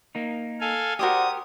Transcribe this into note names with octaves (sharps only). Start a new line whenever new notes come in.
A#3 D#4
A4 F5 G#5
F#4 G4 A#4 C5 D5 D#6